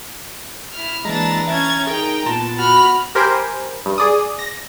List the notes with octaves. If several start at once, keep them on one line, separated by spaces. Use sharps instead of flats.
E4 F6
E3 G#3 A#3 D4 A#5 A6
C#4 E5 G#6 A6
D#4 G#4 A#4 G5
A#2 B3 A5 C6 A#6
F#4 B5 F6
G4 A#4 C5 G5 G#5 B5
G2
G#4 D5 D#6
A#6